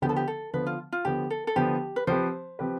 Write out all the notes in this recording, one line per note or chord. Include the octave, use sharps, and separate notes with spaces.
D3 F3 B3 G4
A4
G4
A4
D3 F3 B3 B4
F4
F4
D3 F3 B3 G4
A4
A4
D3 F3 B3 G4
B4
F3 C4 G4 B4 C5
F3 C4 G4 B4